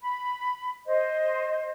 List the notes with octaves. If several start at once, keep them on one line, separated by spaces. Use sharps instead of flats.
B5
C5 D#5